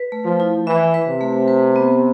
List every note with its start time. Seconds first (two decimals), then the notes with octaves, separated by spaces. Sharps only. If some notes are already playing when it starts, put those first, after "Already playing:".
Already playing: B4
0.12 A3
0.26 F3
0.40 E4
0.67 E3 E5
0.94 B4
1.08 C3
1.21 A3
1.48 B4
1.76 B3